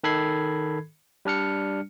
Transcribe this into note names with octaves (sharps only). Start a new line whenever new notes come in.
D#3 A4 B5 G#6 C7
G3 D4 F6 C#7